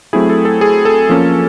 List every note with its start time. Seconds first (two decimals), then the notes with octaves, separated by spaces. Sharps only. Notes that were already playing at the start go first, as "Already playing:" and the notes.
0.13 F#3 A3 C4 E4 G#4
0.30 A4
0.45 A4
0.61 G#4
0.85 A4
1.09 F3 A#3 C#4